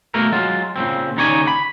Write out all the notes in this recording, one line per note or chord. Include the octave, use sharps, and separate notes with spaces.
B2 A3 A#3 A#4
F#3 G#3 F4
A#2 C#3 C4
D#2 C#3 D#4 C#5 D5 G#5
B5